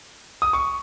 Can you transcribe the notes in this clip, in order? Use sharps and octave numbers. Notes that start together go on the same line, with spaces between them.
D#6
C#6